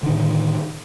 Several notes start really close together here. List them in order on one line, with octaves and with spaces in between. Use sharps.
D3 D#3 A2